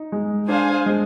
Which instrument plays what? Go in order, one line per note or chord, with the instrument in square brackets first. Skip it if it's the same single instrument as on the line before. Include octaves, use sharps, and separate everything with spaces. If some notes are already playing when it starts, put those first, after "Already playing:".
Already playing: [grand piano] D#4
G#3
[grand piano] D4 [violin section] G#4 C5 F5 G#5
[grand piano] G#3